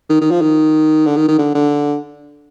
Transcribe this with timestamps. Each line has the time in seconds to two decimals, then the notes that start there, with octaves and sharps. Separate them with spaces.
0.10 D#3
0.21 D#3
0.31 F3
0.42 D#3
1.06 D3
1.17 D#3
1.28 D#3
1.38 D3
1.55 D3